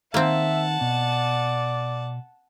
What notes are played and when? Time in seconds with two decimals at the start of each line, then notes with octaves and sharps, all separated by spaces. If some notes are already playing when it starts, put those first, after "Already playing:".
0.14 D#3 A#3 C4 E5 F#5 A5
0.81 B2 D5